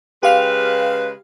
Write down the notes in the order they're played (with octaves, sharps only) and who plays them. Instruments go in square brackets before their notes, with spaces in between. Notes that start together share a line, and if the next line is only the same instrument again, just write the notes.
[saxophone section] C#3 G#3 B4 [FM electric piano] G4 F5 F6